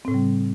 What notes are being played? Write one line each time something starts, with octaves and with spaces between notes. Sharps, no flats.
A2 C#3 G3 C4